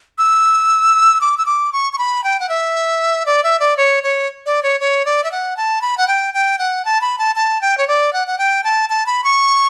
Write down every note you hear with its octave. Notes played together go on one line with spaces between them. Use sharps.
E6
D6
E6
D6
C#6
C#6
B5
G5
F#5
E5
D5
E5
D5
C#5
C#5
D5
C#5
C#5
D5
E5
F#5
A5
B5
F#5
G5
G5
F#5
A5
B5
A5
A5
G5
C#5
D5
F#5
F#5
G5
A5
A5
B5
C#6